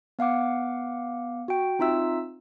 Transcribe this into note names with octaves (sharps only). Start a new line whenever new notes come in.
B3 F5 F#5 D6
F#4 G5
C4 D#4 F4 E5 E6